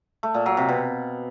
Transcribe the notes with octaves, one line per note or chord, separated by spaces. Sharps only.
A3
A#2
F#3
C3
B2